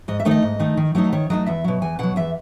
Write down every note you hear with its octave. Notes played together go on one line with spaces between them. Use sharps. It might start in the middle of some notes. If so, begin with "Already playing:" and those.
G#2 D#5
E5
D#3 A3 D#4 C#5
D#5
G#2
D#3 A3 D#4
D#3
F#3 A3 D#4
D#3 C#5
F#3 A3 D#4 D#5
E2 E5
B2 F#3
E2 G#5
B2 F#3 F#5
E2 E5